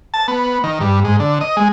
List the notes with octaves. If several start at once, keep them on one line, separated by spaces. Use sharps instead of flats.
A5
B3
D#3
G2
G#2
D3
D#5
G#3